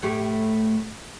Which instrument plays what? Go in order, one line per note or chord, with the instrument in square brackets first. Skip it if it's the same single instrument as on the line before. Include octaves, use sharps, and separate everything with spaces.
[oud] A2 A3 G4